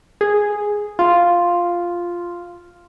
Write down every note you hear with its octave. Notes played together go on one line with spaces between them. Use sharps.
G#4
F4